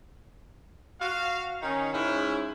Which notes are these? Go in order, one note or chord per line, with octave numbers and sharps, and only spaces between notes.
F#4 F5
D#3 C#4 D#4
G#2 G#3 C#4 E4